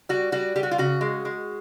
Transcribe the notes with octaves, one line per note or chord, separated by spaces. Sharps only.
G3 F#4
G3 F#4
G3 G4
F#4
F4
C#3 F#4
G#3
G#3